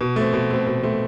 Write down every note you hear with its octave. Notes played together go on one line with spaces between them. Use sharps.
B2
A3 C4
B2
A3 C4
B2
A3 C4